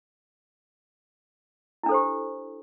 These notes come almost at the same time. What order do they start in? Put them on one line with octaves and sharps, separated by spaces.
E4 D4 A4 C5 G4